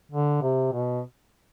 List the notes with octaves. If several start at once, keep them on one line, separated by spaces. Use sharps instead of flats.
D3
C3
B2